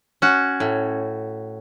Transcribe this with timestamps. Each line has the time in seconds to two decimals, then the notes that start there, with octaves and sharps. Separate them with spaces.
0.22 C#4 F#4
0.60 A2